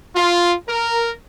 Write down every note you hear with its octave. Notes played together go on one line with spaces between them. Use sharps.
F4
A#4